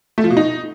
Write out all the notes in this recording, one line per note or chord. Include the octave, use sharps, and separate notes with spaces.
A3
F3
B2
D#4